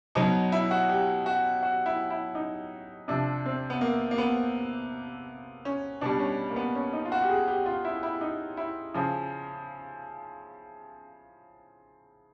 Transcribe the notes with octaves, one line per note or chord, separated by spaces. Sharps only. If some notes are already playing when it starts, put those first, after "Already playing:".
B2 F#3 D#4
E4
F#4
G4
F#4
F#4
E4
E4
D#4
C3 F3 D4
C4
B3
A#3
A#3
B3
C#4
B2 G3 D4
C#4
A#3
B3
C#4
D#4
F4
F#4
G4
G#4
G4
F4
E4
E4
D#4
E4
C#3 F3